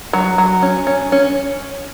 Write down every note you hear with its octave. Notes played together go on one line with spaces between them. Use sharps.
F#3
F#3
C#4
C#4
C#4